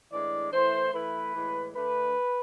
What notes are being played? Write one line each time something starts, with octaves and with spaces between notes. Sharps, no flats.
A2 E3 G#3 D4 D5
E3 A3 E4 C5
E3 A3 E4 B4
A2 E3 G#3
D3 A3 D4 B4